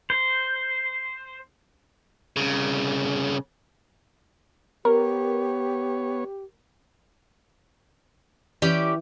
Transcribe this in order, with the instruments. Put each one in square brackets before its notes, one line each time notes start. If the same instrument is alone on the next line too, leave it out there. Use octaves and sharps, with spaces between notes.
[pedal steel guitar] C5
[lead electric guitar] C2 C#3
[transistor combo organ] B3 C#5 [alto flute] G4 [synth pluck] A#4
[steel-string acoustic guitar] E3 [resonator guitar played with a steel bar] C#4 G4 D5